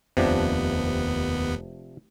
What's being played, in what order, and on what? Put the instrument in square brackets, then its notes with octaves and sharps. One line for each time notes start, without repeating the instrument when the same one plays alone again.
[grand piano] F1 A5 [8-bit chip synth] D#2 B3 [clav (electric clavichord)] C3 F3 D4